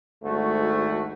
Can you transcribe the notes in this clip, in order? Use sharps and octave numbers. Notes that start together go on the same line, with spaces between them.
G#1 D2 A3 F#4